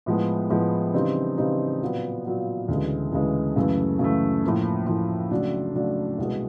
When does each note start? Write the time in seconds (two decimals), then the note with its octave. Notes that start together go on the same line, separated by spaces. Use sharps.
0.06 A2 F3 G#3 B3
0.50 A2 F3 G#3 B3
0.93 C#3 E3 G3 C4 D#4
1.38 C#3 E3 G3 C4 D#4
1.82 A#2 F#3 B3
2.25 A#2 F#3 B3
2.68 D2 C#3 E3 G#3
3.12 D2 C#3 E3 G#3
3.56 F#2 C#3 E3 A3
3.99 F#2 C#3 E3 A3
4.44 A2 F3 A#3
4.87 A2 F3 A#3
5.31 C#3 F#3 A3 D4
5.75 C#3 F#3 A3 D4
6.18 C2 B2 G#3